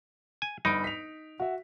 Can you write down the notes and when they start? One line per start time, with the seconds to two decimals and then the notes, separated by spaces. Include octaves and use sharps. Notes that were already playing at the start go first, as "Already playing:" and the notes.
0.42 G#5
0.65 G1 D#4 B5 D7
0.84 B6 F7
1.40 F#4 E5